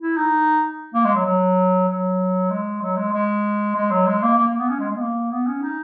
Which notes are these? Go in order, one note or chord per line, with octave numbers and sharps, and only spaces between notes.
E4
D#4
A#3
G#3
F#3
F#3
F#3
G#3
F#3
G#3
G#3
G#3
F#3
G#3
A#3
A#3
A#3
B3
C#4
G#3
G#3
B3
A#3
B3
C#4
D#4